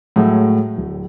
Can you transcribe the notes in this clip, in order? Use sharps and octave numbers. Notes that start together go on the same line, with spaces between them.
A2 F#3 G#3 A3
D1